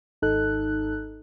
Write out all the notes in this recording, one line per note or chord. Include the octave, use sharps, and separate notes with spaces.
G#1 D#4 A4 F#6